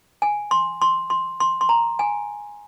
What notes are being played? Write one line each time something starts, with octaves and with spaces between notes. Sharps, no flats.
G#5
C6
C6
C6
C6
C6
A#5
G#5